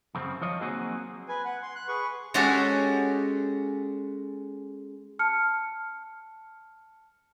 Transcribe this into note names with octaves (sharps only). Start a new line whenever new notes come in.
F#2 C#3 C4
F3 F4 C#5 D#5
F#3 A#3 C4 D#4 F#4 G#4
B4 G#5
F#5
C6
F#6
G#4 B4 C#6
G#3 C#4 F#4 G4 A4
A5 F6 C#7